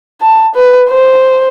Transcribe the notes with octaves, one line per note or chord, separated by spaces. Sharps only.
A5
B4
C5